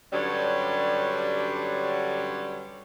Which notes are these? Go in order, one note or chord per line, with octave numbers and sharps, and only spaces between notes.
G2 D3 F#3 G3 C#4